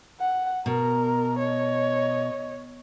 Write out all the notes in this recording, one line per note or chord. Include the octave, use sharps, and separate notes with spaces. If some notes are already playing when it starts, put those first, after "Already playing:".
F#5
B2 A#4
C#5 D#5